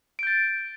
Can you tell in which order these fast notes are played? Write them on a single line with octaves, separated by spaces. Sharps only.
D7 G6 A6